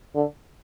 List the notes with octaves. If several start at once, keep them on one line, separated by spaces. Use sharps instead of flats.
D3